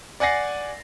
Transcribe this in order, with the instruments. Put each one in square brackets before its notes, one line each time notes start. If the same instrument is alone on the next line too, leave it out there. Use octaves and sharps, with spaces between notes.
[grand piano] D5 F#5 G#5 A6 A#6 C7